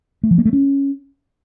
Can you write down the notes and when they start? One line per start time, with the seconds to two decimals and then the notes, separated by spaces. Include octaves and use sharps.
0.23 A3
0.31 F3
0.38 A#3
0.45 A3
0.53 C#4